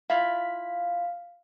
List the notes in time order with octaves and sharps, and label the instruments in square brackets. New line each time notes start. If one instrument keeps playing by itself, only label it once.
[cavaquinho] E4 F4 [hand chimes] F5 B6